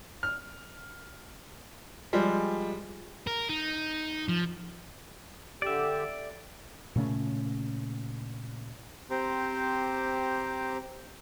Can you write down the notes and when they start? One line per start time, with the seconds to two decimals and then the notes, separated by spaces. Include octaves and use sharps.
0.23 F6
2.13 F3 G3 G#3
3.27 A#4
3.49 D#4
4.28 F3
5.62 D3 G4 D5 E5
6.96 A#2 C#3 A3 C#4
9.10 C4 G4 C5 A#5 C6 D6